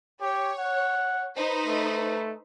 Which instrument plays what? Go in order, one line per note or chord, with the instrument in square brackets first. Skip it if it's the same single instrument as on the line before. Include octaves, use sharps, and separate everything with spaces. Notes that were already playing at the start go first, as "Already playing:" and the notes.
[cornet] G4 [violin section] C#5
[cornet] F#5
[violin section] D#4 B4 C5
[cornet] A3